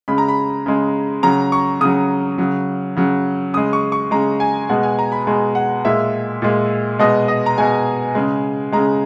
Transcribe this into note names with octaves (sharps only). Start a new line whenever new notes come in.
C#3 G#3 B5
A#5
B5
C#3 G#3
C#3 F#3 A#5
C#6
C#3 F#3 D#6
C#3 F#3
C#3 F#3
C#3 G#3 D#6
C#6
C#6
C#3 G#3 A#5
G#5
B2 G#3 F#5
G#5
A#5
B5
B2 G#3
F#5
A#2 G#3 E5
A#2 G#3
B2 G#3 D#5
D#5
A#5
B2 G#3 G#5
C#3 G#3
C#3 G#3 A#5